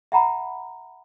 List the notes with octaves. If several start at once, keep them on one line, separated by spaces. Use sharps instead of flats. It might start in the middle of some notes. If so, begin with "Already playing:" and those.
E5 F#5 A#5 B5